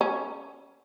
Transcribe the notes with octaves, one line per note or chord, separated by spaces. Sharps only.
C#4